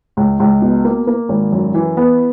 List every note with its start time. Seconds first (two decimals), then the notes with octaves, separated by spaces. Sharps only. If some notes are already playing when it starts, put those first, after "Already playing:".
0.17 C#2
0.40 C#2
0.62 B2
0.85 A#3
1.07 A#3
1.29 G#1
1.52 F#2
1.74 E3
1.97 B3